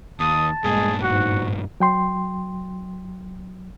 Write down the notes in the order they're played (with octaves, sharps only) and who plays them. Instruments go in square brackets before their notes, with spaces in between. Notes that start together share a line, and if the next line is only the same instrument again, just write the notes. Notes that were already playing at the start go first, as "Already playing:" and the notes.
[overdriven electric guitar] D#2 [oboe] A5 [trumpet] D#6
[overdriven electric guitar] G2 A#2 [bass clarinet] G#3 [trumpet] G#4
[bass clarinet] G#2 [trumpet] F#4 [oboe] F#5
[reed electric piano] F#3 G5 C6